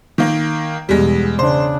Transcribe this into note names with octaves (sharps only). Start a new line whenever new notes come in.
D#3 A#3
E2 B2 G3 G#3
C#3 D4 C5